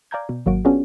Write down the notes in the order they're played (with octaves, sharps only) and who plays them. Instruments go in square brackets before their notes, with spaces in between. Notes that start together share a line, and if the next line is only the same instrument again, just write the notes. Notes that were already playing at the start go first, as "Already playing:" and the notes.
[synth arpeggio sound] D5 F5 G#5 A#5 G6 G#6
B2
G#1 F#3 A#3 F#4 D7
B3 C#4 D4 F4 F#4 G#4